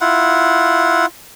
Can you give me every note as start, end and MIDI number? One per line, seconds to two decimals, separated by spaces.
0.01 1.06 64
0.01 1.06 65
0.01 1.06 78